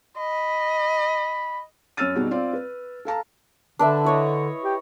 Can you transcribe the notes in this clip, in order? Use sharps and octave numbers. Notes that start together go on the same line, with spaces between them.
D#5 B5
F#2 C#5 E6 F6 A6 D#7
B2 G3 D#4 F#4 G#4
C4 F4 D5
B4
A4 F5 A5 A#5
D3 D4 B4 E5
E4 C#5 D#5
G4